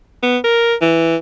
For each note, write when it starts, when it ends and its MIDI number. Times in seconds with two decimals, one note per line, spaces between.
0.23 0.38 59
0.44 0.75 70
0.82 1.16 52